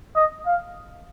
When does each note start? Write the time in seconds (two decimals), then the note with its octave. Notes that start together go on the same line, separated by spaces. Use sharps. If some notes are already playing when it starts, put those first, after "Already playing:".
0.16 D#5
0.46 F5